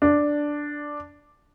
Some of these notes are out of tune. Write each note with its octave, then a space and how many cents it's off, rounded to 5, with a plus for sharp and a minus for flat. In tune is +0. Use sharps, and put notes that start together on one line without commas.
D4 +0